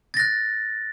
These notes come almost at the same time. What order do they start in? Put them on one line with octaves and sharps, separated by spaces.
A6 A#6 F#6